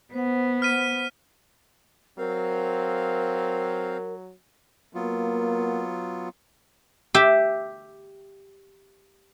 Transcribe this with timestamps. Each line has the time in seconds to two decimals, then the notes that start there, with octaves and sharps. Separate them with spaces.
0.14 B3 C5 F#5
0.62 F6 B6 D#7
2.18 F#3 C4 A#4 F5
4.95 F#3 A#3 B3 F4
7.14 G4 E5